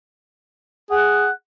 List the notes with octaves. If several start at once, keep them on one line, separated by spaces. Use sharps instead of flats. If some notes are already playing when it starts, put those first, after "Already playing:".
G#4 F#5